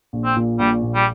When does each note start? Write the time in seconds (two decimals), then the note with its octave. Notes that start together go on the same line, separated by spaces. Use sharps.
0.13 A#1
0.25 C4
0.36 A#2
0.59 A#1 G3
0.83 A#2
0.95 G3